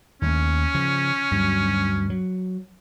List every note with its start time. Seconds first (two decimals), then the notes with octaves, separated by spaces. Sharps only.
0.22 D#2 G#3 A3 C#4
0.74 C#3 F3
1.31 D2 G2 F#3
2.10 F#3